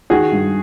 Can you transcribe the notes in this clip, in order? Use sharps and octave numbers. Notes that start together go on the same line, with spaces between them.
D#3 F#4 G#4
G2